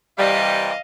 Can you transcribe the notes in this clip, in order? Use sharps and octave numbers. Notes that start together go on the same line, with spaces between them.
C3 E3 G3 D#5 F5